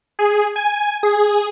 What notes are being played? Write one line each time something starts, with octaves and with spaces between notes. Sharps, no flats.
G#4
G#5
G#4